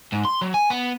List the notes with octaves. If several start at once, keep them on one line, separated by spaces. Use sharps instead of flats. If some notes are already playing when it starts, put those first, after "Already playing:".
G#2
C6
F#3
G#5
B3